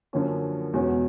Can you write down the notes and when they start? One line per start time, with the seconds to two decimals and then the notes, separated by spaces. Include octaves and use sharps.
0.13 F#2 D3 F3 A#3 C#4
0.74 E2 B2 G#3 C#4 F#4